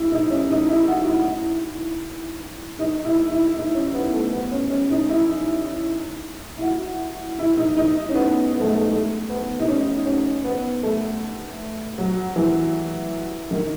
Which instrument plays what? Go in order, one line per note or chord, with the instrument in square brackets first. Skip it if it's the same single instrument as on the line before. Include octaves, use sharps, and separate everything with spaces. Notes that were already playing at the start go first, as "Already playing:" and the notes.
Already playing: [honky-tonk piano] E4
D#4
C#4
D#4
E4
F#4
E4
D#4
E4
E4
D#4
C#4
B3
A3
B3
C#4
C#4
D#4
E4
E4
F#4
E4
D#4
D#4
C#4
B3
B3
A3
G#3
A3
A3
B3
D#4
C#4
C#4
B3
A3
F#3
E3
D#3